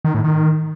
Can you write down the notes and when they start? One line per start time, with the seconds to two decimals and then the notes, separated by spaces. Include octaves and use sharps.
0.05 D#3
0.14 A2
0.24 D#3